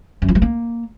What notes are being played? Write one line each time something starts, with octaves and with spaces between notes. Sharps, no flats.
F#2
F3
G3
A#3